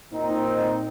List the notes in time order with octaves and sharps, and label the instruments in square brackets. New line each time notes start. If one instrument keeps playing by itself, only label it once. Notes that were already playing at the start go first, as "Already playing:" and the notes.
[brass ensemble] A#2 C4 D#4